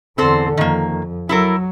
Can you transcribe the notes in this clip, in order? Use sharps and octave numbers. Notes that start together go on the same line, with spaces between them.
E2 D3 C4 A4 C5
F2 D#3 A#3
F#3 E4 A4 A#4